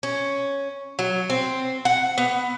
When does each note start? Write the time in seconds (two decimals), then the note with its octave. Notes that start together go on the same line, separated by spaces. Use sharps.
0.03 C#4
0.99 F#3
1.30 C4
1.85 F#5
2.18 B3